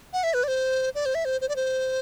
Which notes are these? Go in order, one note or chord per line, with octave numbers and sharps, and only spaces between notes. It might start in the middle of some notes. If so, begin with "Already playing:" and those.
F#5
E5
B4
D5
C5
D5
C5
E5
C5
C5
D5
C5